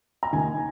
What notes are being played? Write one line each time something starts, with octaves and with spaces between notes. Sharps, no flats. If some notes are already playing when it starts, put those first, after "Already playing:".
A#5
D#2 D#3 G#5